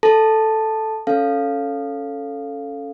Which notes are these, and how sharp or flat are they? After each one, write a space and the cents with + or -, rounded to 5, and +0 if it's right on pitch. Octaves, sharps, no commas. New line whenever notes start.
A4 +0 A5 +0
C#4 +0 A4 +0 F5 +0